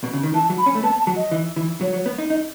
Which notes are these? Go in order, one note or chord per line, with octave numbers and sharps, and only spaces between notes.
B2
C#3
D#3
E3 A5
F#3
B5
C#4
A3
B3 A5
A5
F#3
D#5
E3
E3
F#3 C#5
F#3
B3
D#4
D#4 D#5